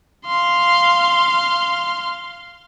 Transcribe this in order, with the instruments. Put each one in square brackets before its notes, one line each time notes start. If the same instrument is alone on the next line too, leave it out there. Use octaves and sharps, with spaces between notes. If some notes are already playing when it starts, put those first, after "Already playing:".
[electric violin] F5 C6